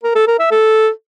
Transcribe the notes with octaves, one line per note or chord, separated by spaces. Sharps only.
A#4
A4
A#4
E5
A4